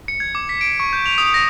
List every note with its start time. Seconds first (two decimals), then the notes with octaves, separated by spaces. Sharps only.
0.08 C#7
0.20 G#6
0.35 D6
0.49 B6
0.61 D7
0.80 C#6
0.93 G6
1.06 F7
1.18 D#6
1.34 A#6